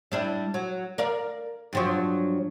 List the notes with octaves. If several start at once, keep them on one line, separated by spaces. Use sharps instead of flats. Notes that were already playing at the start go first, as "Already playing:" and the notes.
G3 D4 E4
F#3
A#4 D5 F5
G2 F3 F#3